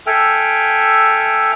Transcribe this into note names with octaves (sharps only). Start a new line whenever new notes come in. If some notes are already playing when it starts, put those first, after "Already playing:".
A4 E5 G5 G#5 F6